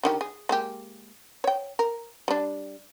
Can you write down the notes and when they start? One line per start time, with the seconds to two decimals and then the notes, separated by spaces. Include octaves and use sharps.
0.03 D3 D#3 G4
0.21 G#4
0.49 G#3 A#3 G4
1.44 C#5 G5
1.79 A#4
2.28 G3 D4